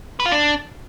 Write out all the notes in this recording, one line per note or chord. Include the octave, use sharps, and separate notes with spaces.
B4
F4
D4